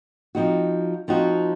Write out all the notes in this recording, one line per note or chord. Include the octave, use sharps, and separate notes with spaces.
F3 C4 D#4 F#4
F3 C4 D#4 F#4